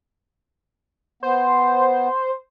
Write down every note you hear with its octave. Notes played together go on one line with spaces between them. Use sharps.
B3 C5